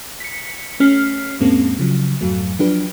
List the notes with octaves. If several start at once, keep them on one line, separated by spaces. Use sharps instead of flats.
B6 C#7
A3 C#4 F6 B6 C7
F2 A2 G#3 A#3 C4 C#4
C#3 F3 F#3
F2 G#2 F#3 A3
F3 F#3 D4 G4 B4